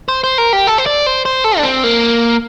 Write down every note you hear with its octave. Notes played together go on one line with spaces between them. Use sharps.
C5
C5
A#4
G4
A4
C5
D5
C5
C5
A4
D4
C4
A#3